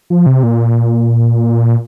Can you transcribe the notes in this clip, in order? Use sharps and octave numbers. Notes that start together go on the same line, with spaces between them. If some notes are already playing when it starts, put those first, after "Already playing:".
F3
C3
A#2